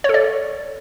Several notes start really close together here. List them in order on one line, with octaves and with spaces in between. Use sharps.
C#5 A4 D5